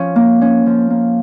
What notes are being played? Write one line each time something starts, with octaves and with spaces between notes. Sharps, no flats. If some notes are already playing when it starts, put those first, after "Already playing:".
Already playing: F3 C#4
A#3
C#4
F3
A#3